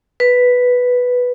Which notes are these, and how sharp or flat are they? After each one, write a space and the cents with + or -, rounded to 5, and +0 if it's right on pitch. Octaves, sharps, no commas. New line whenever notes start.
B4 +0